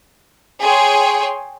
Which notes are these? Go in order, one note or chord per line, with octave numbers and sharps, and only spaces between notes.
G#4 C#5 G5 C6